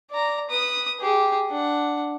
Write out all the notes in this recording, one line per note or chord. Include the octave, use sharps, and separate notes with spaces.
D5 A#5
B4 D#6
G4 G#4
D4 F#5